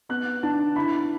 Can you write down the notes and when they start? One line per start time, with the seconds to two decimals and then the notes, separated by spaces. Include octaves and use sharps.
0.09 B3 F#6
0.43 D4 A5
0.76 E4 B5